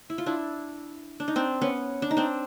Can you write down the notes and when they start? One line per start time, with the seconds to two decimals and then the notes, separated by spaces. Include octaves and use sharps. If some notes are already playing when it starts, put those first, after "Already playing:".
0.10 E4
0.18 F4
0.26 D4 E4
1.20 D4
1.28 D#4
1.36 C4 D4
1.61 B3 C#4
2.02 D4
2.11 D#4
2.17 C4 D4